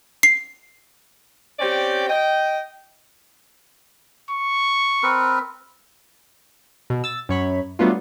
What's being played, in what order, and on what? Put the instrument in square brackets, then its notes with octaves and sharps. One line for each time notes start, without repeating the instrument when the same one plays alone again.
[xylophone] C7
[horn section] C4 C#4 G4 D5 G5
D#5 G5
[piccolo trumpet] C#6
[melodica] C4 A#4 B4
[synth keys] B2
E6 A6
F#2 C#5 B5
F#3 G3 A3 B3 D4 F4